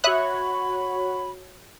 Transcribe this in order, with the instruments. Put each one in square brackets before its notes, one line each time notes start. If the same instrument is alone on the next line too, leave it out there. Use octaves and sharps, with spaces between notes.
[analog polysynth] F#4 C#5 [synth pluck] E5 D#6 F#6 [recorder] B5